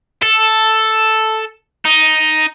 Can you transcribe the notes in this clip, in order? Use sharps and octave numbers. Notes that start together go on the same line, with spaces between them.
A4
D#4